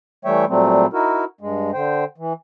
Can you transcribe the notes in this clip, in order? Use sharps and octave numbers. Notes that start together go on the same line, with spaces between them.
E3 G3 A3 C#5 E5 G5
A#2 F#3 G3 A3 C4
D#4 E4 F#4 A#4
G2 G#3
D3 C5 G5
E3